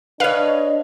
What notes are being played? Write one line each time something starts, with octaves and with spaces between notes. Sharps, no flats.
D4 B4 C#5 D#5 F5